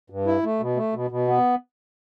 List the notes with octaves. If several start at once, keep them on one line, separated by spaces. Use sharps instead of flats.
G2
E4
A3
B2
A3
B2
B2
B3